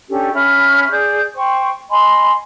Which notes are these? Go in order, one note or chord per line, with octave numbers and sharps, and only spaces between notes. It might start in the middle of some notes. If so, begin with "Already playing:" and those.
C#4 D4 G4 A4
C#4 E5 B5 F6
G#4 D5 G6
C5 G5 C#6
D#5 G#5 B5 C6